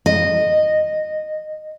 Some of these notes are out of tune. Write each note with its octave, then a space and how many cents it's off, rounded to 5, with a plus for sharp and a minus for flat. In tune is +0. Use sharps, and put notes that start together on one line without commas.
D#5 -15